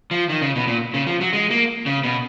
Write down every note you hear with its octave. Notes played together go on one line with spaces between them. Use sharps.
F3
D#3
C#3
B2
A#2
C#3
F3
F#3
G#3
A#3
C#3
B2